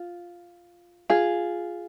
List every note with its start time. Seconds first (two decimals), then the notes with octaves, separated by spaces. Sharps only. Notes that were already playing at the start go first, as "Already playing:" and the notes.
Already playing: F4
1.10 F4 G#4